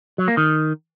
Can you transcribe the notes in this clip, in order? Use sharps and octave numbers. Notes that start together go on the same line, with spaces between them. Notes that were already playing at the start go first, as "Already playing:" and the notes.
F#3
A#3
D#3